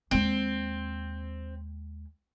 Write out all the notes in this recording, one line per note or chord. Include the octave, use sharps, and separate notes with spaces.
D#2 G#3 C4